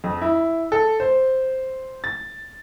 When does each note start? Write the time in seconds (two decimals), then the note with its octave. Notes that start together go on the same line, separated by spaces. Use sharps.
0.04 F2
0.22 E4
0.72 A4
1.00 C5
2.04 A6